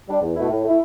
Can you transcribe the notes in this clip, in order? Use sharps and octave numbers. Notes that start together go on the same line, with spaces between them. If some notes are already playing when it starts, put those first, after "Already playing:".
G3 D4
E2
B2 A3 E4
A2
A3 E4